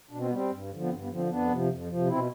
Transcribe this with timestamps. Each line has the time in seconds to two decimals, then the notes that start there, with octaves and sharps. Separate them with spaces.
0.11 B2 D4
0.19 C4
0.26 B3
0.31 G3 C4
0.50 G2
0.70 D3 F3
0.81 B3
0.89 G2 C4
1.03 B3
1.09 D3 F3
1.16 C4
1.29 F2 B3 D4
1.49 C3 F3
1.69 F2
1.88 C3 F3
2.08 B2 C4 E4